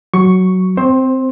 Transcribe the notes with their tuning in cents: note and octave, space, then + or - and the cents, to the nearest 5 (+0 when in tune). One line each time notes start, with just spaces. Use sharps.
F#3 +5 C#6 +0
C4 -10 C5 +15